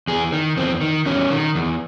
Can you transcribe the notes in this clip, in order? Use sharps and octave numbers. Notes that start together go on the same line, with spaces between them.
E2 G#4
D#3
E2 C4
D#3
E2 C#4
D#3
E2